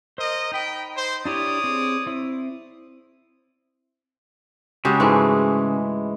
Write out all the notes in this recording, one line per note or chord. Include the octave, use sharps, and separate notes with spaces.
A#4 C5 D#5
D#4 D#5 G5 B5
C5
D4 E4 G4 C#5 D5 D#6
C4 G#4
C4 E4
C#3 G#3 F#4 G4 E5
G#2 E3 G#3 A3